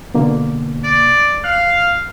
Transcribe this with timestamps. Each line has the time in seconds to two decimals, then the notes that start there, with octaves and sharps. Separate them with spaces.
0.14 B2 D3 A#3
0.84 D5
1.44 F5 F#6